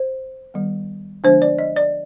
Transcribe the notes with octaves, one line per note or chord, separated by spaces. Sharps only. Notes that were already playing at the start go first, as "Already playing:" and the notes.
Already playing: C5
D#3 G3 B3
D3 F3 G#3 B3 D4 C5
D5
D#5
D5